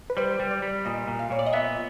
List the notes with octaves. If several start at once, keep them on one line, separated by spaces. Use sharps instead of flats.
B4
G3 C5
G3
D5
G3
A#2 D#5
A#2
F5
A#2 C#5
D5
D#5
B3 E5